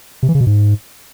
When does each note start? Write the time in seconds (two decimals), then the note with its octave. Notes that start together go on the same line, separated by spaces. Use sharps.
0.23 C3
0.29 E3
0.35 C#3
0.41 B2
0.47 G#2